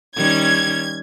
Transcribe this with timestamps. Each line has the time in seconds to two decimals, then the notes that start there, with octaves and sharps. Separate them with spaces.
0.16 D#3 G3 C#4 G#6